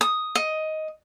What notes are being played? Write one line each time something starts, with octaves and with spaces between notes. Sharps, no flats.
D#6
D#5